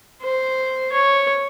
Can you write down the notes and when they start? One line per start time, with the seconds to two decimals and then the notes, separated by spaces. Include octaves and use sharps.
0.22 C5
0.92 C#5